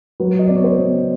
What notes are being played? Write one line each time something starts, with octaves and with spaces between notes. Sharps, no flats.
F#3 B4
D#5
B3 D5
C#5
C5
B3